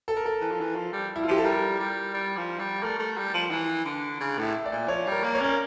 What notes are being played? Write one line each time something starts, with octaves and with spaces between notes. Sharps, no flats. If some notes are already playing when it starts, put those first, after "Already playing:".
A4
A#4
A4
E3
F3
E3
F3
G3
E4
F4
F3 G4
A4
G3 A#4
G3
G3
F3
G3
A3 A#4
A3
G3
F3
E3
D3
C#3
A2 E5
D5
A#2
F3 C#5
G3
A#4
A#3
C#5
C#4 A#4